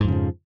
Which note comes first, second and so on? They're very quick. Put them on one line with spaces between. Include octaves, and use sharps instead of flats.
G#2 F2 C#3 F3